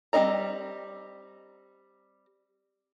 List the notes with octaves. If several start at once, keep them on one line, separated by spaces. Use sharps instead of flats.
G3 C4 D#4 D#5 A#5